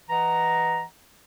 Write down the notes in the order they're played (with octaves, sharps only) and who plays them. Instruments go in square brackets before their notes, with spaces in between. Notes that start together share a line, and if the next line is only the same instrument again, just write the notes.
[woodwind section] E3 D#5 F#5 A#5